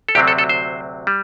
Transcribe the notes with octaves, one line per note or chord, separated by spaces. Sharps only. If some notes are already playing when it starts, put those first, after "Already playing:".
A4
D2 C3 F#3 C4 G4
A4
A4
C5
G3